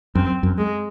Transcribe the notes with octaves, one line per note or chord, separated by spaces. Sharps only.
F#2 C4
F#2
G#3